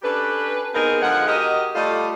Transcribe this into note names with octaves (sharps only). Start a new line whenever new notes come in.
C#4 D4 G4 A4 B4
B3 C4 D#4 G#4 A#4
D3 F3 G#3 F#5
F#4 G4 A#4 D#5
G3 A3 F4 A4 D5 D#5